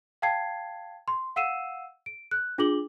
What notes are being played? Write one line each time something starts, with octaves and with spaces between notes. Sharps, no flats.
F5 G5 A5 G#6 C7
C6
F5 F#5 E6 C7 D#7 E7
D7
F#6
D4 F4 G#4 D6 F#7 G7